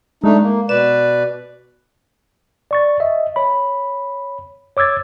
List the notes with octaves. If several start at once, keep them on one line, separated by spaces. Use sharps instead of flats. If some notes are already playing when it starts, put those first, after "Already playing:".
G#3 A3 D4 D#4
A#3
B2 B4 D5 E7
D5 C#6 A6
D#5 E5
C#5 B5
C#5 D6 E6 G#6 A6